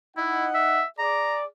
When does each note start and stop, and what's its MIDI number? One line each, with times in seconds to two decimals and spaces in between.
0.17 0.82 63
0.17 0.46 64
0.17 0.82 75
0.17 0.82 78
0.55 0.85 76
0.99 1.44 68
0.99 1.44 74
0.99 1.38 82